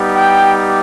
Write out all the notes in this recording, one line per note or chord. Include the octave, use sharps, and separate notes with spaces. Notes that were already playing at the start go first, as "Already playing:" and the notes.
Already playing: G3 B3 D#4 G4
G5